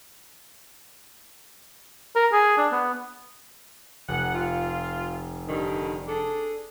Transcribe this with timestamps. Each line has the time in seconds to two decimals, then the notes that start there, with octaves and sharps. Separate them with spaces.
2.16 A#4
2.32 G#4
2.58 D4
2.72 B3
4.09 F1 F#5
4.34 F4
5.49 G2 D3 D#3
6.07 D4 G#4 A4